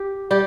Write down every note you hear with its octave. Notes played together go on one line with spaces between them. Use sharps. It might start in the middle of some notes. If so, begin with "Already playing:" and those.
Already playing: G4
G3 G4